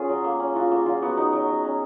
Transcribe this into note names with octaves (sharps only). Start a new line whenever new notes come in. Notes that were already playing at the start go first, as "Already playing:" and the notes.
Already playing: C#4 F4 G#4
F#3
A#3
C#4
F4 F#4
A#3 F#4
F#3 F4
B3 F#4
D#4 F#4
F#3
F#3
C#4